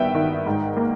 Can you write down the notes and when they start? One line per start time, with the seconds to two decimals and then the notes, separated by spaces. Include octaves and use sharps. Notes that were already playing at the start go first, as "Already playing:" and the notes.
Already playing: G2 D#3 B3 E5 G5
0.14 D#3
0.46 G#2
0.77 A#3